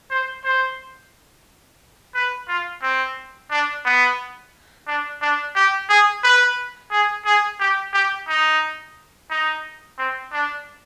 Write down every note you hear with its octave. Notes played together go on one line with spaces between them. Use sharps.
C5
C5
B4
F4
C4
D4
B3
D4
D4
G4
G#4
B4
G#4
G#4
G4
G4
D#4
D#4
C4
D4